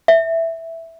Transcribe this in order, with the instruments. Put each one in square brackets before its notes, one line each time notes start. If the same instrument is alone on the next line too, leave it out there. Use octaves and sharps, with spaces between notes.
[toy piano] E5